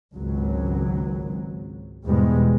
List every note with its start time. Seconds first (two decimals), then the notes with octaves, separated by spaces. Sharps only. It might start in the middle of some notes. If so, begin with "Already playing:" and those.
0.15 G#1 C#2 F#3
2.06 E2 G#2 B2 G3 G#3